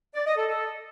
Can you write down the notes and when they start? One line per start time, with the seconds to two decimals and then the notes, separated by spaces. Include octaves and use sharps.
0.14 D5
0.25 D#5
0.36 A4
0.47 A4